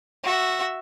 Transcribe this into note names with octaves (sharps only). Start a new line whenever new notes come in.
F#4 E5